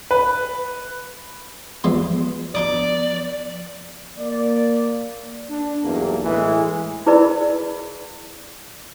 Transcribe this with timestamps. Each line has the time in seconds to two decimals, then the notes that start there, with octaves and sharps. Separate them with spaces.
0.11 B4
1.84 E2 F3 G#3 B3 B4 C6
2.55 D4 D#4 D5 D#6
4.19 A#3 D5
5.50 D4
5.84 B1 E2 G2 A#3
6.25 A2 E3 G#3
7.06 E4 G#4 A#4 B4 D5 B5